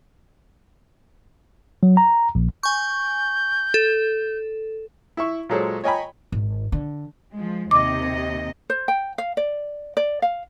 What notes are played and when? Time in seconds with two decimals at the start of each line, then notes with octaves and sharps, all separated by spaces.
1.83 F#3
1.97 A#5
2.35 A#1
2.63 G#5 C#6 G6
3.74 A4
5.17 E4 E5 C#6
5.49 A#2 F#3 G#3 A4 C5 C#5
5.84 C#5 D#5 G5 G#5 A#5 B5
6.32 G#1
6.72 D3
7.34 F3 G#3
7.71 D#2 C3 D#5 D6
8.70 C5
8.88 G5
9.18 F5
9.37 D5
9.97 D5
10.22 F5